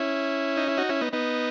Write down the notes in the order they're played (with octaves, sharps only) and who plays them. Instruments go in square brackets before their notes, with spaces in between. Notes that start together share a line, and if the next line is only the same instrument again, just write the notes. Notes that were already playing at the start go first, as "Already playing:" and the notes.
Already playing: [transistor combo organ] C#4 E4
D#4
E4
D#4 F#4
C#4 E4
B3 D#4
B3 D#4